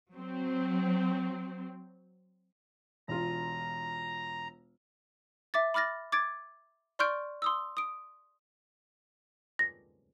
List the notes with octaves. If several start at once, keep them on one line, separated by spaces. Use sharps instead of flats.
F#3 C4
E1 F4 A#5
E5 D6 A6
B5 D6 F6 A6 A#6
D6 G#6 A6 D7
D5 C6 C#6 F6 G6 D7
C6 D#6 E6
D#6 D7
A#6